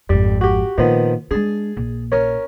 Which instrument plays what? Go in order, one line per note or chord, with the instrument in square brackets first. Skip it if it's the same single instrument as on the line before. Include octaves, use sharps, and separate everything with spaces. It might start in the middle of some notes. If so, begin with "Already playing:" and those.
[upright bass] G#1 F2 [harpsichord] G3
[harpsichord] F#4 G4
[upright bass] A#2 [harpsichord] D#3 F3 B3
[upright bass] G#3 D4 [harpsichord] G#4 A5
[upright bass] A#1
[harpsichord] C#4 A#4 C#5